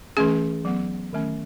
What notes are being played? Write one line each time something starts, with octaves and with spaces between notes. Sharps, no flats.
E3 A3 C#4 G#4
F#3 B3
D#3 A3 C#4